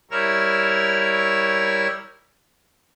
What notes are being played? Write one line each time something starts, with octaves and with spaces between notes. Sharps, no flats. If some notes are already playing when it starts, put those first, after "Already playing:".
G3 E4 A#4 C#5 E6 F6